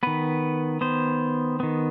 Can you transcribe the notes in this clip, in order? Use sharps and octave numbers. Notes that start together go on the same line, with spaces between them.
D#3 B3 B4
D#3 B3 C5
D#3 B3